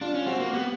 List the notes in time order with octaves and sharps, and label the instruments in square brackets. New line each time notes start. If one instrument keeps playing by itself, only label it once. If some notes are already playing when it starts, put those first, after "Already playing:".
[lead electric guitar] D4 [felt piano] F4
[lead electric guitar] C#4
[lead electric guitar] C4 [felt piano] F#4
[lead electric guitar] A#3
[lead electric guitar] B3 [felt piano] G4